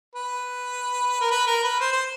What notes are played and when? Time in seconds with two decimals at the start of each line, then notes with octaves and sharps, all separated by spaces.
0.15 B4
1.21 A#4
1.31 B4
1.47 A#4
1.63 B4
1.80 C5
1.92 C5